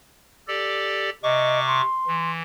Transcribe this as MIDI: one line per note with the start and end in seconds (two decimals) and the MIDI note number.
0.48 1.10 67
0.48 1.10 69
0.48 1.10 74
1.23 1.82 48
1.23 1.60 75
1.23 1.82 85
1.23 1.82 86
1.67 2.31 84
2.07 2.43 52